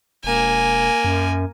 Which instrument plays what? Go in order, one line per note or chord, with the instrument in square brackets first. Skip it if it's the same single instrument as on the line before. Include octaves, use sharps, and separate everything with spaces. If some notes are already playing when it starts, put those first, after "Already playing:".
[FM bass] E1 [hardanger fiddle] A#3 G#5
[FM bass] F#2